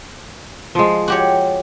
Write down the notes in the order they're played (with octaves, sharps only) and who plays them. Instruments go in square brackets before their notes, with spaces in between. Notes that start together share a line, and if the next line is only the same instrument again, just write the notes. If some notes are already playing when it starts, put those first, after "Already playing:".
[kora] F3 G#3
[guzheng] F#4 G4 C#5